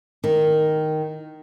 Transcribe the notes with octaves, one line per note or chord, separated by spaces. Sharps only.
D#3